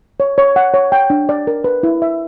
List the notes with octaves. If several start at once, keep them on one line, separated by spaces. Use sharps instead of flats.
C#5
C#5
F#5
C#5
G5
D4
D5
A#4
B4
E4
E5